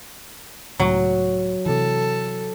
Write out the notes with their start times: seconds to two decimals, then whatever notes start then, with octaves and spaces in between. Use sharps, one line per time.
0.80 C#2 A2 F#3
1.66 C3 E3 A4